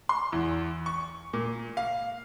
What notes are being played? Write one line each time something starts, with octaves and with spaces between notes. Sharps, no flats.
C6
E2
C#6
A#2
F5